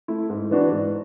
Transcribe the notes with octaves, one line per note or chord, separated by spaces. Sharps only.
A3 E4
G#2
E3 B3 D4 F#4
G#2